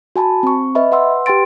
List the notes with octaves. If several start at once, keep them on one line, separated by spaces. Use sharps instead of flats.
F#4 G#5 A5 B5
C4 C#6
B4 D#5 E5 B5
B4 F#5 C6 E6
G4 B4 G5 C6 A6 D7